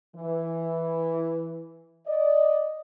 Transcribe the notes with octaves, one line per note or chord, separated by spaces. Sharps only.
E3
D5 D#5